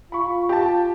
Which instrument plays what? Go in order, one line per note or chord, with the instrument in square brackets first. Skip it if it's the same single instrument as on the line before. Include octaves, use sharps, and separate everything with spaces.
[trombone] F4 [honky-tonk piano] B5 C#6
[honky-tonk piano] G4 A5